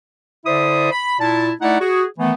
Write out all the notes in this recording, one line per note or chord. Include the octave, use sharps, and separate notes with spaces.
D3 E4 C5 D5 E5 D#6
B5
A#2 E4 A5
A3 D#4 E4 D5 F#5
F#4 G#4
D#3 E3 A3 B3